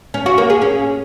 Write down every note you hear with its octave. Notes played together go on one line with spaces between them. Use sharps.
C#4
F#4
A#3
G#4
C#4